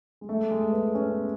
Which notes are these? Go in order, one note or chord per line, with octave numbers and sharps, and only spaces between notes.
G#3
A3
G#3
B3
C#4